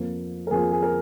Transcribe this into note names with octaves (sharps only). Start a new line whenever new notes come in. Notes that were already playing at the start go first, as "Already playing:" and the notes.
Already playing: F2 F3 A#3 F4
A#4
F2 F3 A#3 F4 G#4
G#4
A#4